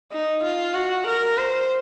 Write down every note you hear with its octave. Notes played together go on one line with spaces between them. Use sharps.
D#4
F4
F#4
A#4
C5